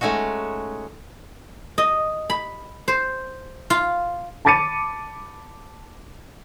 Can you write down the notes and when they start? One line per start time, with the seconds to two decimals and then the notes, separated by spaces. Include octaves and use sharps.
0.01 G#3 A3 C#4 D#4 F#4
1.78 D#5
2.30 B5
2.88 C5
3.70 F4
4.45 A5 B5 D6 A6 C#7 D#7